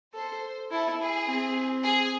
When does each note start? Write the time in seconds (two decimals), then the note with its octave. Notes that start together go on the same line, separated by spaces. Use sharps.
0.14 A4 C5
0.71 E4 A4
1.00 G#4
1.27 C4
1.83 G#4